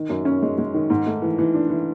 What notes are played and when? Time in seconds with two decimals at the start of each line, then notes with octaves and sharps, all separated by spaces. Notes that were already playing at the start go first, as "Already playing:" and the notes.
Already playing: D#3
0.09 F#2
0.25 C#4
0.42 G#3
0.58 G#3
0.74 D#3
0.90 G#2
1.06 A3
1.22 E3
1.38 E3
1.54 D4
1.70 E3